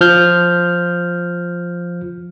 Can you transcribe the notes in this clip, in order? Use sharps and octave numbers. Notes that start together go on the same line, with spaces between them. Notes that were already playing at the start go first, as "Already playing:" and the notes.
F3 F6 G6